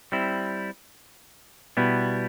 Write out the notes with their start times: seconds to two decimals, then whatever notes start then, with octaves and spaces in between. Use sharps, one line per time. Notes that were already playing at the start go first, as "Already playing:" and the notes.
0.12 G3 C4 E4
1.77 B2 G3 B3 E4